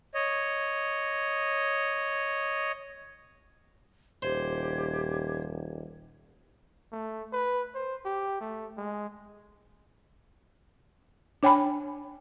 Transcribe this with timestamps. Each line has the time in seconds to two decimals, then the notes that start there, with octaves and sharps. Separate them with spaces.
0.14 C#5 D#5
4.22 D#1 G4 C5 G#6
6.92 A3
7.33 B4
7.75 C5
8.05 G4
8.41 A3
8.77 G#3
11.43 D4 C#5 G5 G#5 B5